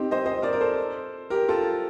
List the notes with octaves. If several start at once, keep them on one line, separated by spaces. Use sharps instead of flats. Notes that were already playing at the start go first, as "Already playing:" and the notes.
Already playing: C4 D#4 G4
C5 D#5
C5 D#5
A#4 D5
A#4
A4 C5
G4 A#4
F4 A4